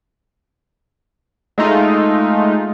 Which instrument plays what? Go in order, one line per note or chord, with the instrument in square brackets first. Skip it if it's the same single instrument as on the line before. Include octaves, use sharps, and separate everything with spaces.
[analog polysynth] G#3 A3 D#4 F4